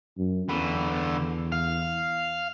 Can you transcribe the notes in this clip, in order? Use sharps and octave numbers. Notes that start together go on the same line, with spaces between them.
F#2
E2 D3 B4
F5